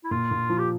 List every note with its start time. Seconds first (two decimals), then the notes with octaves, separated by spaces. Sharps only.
0.04 E4
0.11 A#2 F4
0.31 A#2
0.50 F3
0.58 G4